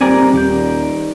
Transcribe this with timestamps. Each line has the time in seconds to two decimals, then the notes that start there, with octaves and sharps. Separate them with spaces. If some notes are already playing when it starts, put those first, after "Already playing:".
0.01 D#1 G3 C4 G4 A#4 D5 G#5
0.34 D#2 D#3 G4 D5 G6